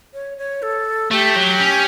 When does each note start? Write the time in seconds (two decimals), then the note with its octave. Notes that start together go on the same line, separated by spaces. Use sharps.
0.14 C#5
0.38 C#5
0.62 A4
1.11 A3 G4
1.36 F#3
1.60 C#4